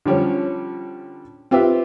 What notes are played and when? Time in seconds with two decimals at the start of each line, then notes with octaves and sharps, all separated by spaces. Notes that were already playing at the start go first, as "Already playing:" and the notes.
0.06 D3 F3 G3 C#4 C#5
1.51 C4 F4 G4 B4 E5